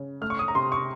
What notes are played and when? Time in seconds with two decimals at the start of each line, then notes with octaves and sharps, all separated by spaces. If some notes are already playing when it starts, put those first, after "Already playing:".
Already playing: C#3
0.21 A3 F6
0.30 C#6
0.39 D#6
0.48 A#5
0.55 C3 C6
0.72 C#6